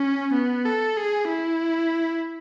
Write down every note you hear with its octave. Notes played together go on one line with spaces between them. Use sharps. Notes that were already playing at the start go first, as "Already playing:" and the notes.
Already playing: C#4
B3
A4
G#4
E4